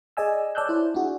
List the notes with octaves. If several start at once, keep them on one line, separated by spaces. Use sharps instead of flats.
G#4 D5 D#5 G#5 E6
C#5 D5 A5 E6 F#6 G6
E4 C5
D4 E4 F#4 G#4